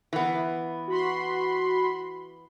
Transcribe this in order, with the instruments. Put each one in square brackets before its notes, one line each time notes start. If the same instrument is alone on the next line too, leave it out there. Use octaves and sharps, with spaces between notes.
[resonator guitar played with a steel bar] E3 B3
[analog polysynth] F#4 B5 C6